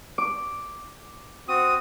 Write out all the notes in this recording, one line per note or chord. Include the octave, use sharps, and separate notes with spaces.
D6
C4 F#4 D#6